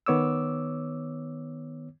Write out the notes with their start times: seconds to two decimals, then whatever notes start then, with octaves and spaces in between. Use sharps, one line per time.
0.06 D#3 B3 C#5 D6 E6